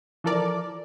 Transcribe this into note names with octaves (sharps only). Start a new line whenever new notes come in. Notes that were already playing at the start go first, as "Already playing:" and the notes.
E3 F3 A4 A#4 D5